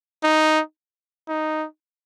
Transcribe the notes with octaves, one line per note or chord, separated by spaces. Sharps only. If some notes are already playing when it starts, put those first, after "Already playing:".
D#4
D#4